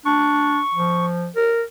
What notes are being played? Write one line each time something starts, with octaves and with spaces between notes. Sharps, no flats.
D4 C#6
F3
A#4